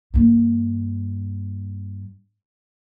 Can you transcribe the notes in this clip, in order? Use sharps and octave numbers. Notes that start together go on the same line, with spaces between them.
G2 A#3